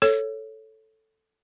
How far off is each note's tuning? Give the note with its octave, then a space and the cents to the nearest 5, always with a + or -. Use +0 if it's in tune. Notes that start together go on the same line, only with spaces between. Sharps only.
A4 +0 C#5 +0